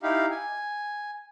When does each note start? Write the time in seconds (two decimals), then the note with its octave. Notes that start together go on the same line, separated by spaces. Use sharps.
0.03 D#4 E4 G4 F5
0.31 G#5